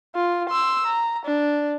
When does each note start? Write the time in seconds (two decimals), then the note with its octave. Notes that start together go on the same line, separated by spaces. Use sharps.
0.15 F4
0.49 C6 E6
0.86 A#5
1.25 D4